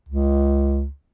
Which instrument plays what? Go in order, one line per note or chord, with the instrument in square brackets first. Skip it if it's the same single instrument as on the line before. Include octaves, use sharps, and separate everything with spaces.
[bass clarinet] C#2